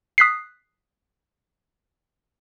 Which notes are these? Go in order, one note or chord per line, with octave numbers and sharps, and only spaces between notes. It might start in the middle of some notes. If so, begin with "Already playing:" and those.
D#6 F#6 B6 C7